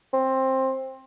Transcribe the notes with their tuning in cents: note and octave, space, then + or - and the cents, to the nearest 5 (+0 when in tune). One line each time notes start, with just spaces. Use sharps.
C4 +15